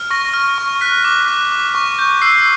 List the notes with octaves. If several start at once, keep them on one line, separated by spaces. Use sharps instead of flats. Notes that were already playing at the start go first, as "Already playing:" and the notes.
Already playing: F6
C#6 A#6
F6
C#6
F#6 B6
D6
F#6
D6
C#6
G6
E6 C7